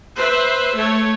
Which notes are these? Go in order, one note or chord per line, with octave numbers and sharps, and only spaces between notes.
B4 C5 E5
A3 C#5